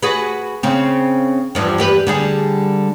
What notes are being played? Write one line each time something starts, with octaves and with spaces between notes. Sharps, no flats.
F#4 G#4 B4
C#3 C4
E2 G2 F3
E2 G4 B4
D3 G3 G#4